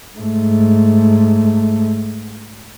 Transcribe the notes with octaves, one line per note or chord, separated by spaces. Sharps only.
G#2 A3